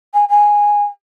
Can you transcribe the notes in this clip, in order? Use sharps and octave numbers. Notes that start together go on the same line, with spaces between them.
G#5
G#5